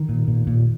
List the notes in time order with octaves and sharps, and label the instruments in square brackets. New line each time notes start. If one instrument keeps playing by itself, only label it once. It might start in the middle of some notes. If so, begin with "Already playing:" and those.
Already playing: [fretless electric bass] D#3
A#2
A#2
A#2